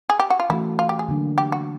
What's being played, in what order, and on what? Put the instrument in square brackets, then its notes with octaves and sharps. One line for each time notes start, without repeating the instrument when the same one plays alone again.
[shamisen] G#4
G4
F#4
F4
[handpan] E3 A3 C#4 F#4 A4 [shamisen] E4
[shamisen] F4
G4
G#4
[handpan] D3 F#3 A#3 D4
[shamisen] G4
F#4